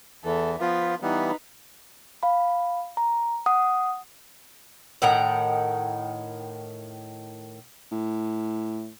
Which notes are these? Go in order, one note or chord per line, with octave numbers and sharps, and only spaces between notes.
E2 E3 A4 E5
F3 B3 F4 B4
E3 G3 B3 D#4 B4
F5 B5
A#5
F#5 D#6
A2 D#3 F#5 A#5
A2